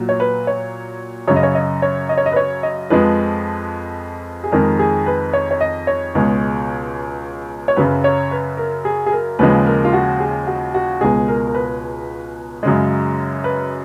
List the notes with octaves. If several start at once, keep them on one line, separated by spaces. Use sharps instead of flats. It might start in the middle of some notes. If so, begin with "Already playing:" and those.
Already playing: A#2 F#3
C#5
B4
C#5
F#2 C#3 F#3 C#5
D#5
C#5
D#5
C#5
D#5
C#5
D#5
B4
C#5
D#5
F2 F3 G#3 B4
G#4
F2 D#3 G#3 A#4
G#4
B4
C#5
C#5
D#5
C#5
C#2 B2 G#3
C#5
F#2 C#3 F#3 B4
C#5
B4
A#4
G#4
G#4
A#4
D#2 C#3 F3 G#3 B4
A#4
F4
F#4
G#4
F#4
F#4
C#2 B2 G#3 G#4
A#4
A#4
B4
F#2 C#3 G#3
B4